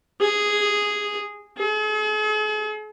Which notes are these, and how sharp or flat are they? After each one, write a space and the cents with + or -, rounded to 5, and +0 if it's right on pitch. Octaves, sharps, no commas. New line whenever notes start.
G#4 -5
G#4 +45